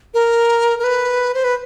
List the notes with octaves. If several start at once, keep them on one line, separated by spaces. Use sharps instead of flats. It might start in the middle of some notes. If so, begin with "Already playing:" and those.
A#4
A#4
B4
C5
B4